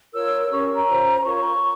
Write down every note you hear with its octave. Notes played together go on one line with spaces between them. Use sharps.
F4 A#4 C#5 E6
E6
C#4 G4 A#4 C#5 C#6
A#5
F4 C5
F4 A#4 C#5 C#6